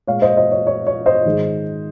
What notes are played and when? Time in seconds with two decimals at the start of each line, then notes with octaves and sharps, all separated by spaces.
0.07 A#2 G#3 C#5 F5
0.22 C5 D#5
0.37 C5 D#5
0.52 C#5
0.67 C#5
0.87 C#5
1.06 C5 D#5
1.25 G#2 D#3 G#3